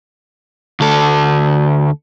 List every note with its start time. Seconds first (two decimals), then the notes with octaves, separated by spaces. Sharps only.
0.80 D2 A4